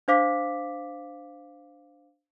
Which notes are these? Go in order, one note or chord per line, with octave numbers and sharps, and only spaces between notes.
D4 C5 F5 D6 B6